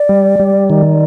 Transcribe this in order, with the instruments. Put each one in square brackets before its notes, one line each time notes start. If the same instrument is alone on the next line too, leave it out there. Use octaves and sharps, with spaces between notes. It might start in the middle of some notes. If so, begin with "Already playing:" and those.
Already playing: [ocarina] D5
[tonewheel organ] G3
G3
D#3